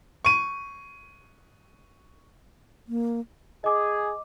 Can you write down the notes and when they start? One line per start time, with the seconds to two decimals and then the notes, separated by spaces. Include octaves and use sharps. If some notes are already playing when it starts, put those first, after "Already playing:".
0.25 C#6 D#7
2.88 A#3
3.64 G#4 D#5 D6